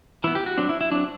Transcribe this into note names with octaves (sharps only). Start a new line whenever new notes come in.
E3 B3 E4
G4
F#4
F#3 C4 D4
E4
E4
F#3 C4 D4